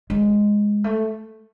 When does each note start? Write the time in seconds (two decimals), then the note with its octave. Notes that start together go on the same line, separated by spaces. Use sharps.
0.10 G#3
0.84 A3